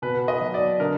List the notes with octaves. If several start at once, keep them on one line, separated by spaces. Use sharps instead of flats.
B2 B4
D#5
F#3
D5
D3 A#4